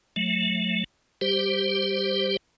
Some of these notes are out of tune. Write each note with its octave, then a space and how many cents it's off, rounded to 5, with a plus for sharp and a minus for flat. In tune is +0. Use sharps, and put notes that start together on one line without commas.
F#3 -30 A3 -5
G3 +0 G4 +0 C5 +0